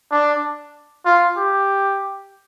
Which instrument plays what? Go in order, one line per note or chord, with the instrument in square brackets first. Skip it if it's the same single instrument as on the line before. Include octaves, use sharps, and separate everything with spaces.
[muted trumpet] D4
F4
G4